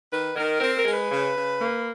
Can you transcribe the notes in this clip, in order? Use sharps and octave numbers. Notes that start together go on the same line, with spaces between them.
D#3 B4
D#3 A#4
C4 A#4
A#4
G#3
B4
C#3
C#3
A#3